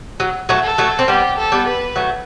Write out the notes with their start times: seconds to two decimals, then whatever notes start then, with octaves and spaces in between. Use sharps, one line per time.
0.20 F#3
0.49 F#3 A3
0.64 A4
0.78 F#3 A3
0.99 C4
1.08 G3 B3 G4
1.38 A4
1.52 G3 B3
1.67 B4
1.96 F#3 A3